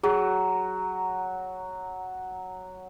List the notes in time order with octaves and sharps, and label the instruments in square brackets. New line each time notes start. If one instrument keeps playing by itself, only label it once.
[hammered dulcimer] F#3 [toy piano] G#4